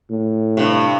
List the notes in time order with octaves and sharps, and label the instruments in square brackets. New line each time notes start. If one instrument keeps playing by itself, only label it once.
[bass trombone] A2
[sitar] G2 C3